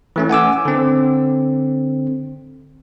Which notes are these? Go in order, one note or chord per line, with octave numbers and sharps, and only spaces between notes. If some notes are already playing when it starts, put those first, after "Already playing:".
E3 A3 C#4
F#5 G#5 D6 E6
D3 C4